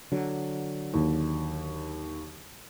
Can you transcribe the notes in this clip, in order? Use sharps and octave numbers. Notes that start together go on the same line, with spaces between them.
D3 F#3
D#2